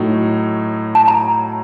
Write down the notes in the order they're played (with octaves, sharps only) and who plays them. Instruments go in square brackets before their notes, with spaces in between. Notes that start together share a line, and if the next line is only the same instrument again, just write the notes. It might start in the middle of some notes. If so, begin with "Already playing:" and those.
Already playing: [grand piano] A2 F#3 A3 D#4
[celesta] A5
A#5